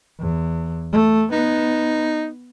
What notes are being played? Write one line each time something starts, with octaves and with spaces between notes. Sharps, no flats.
E2
A3
B3 D#4